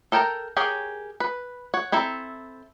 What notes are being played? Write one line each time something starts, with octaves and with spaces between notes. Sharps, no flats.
A4 A#4 G5 A5 A#5
G4 G#4 A#4 C#5
B4
C#5 F#5
C4 E4 A4 A#5